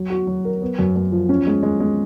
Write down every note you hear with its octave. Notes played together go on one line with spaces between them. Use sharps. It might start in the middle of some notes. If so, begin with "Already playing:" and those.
Already playing: F#3
F#4
F#3
A#4
B3
F#2
F#2
F3
C#4
G#3
G#3
G#3